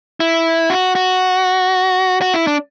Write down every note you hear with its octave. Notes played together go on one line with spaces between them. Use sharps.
E4
F#4
F#4
F#4
E4
D4